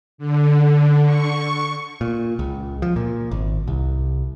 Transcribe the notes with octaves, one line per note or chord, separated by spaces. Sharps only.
D3
C#6
A#2
C#2
F3
A#2
G#1
C2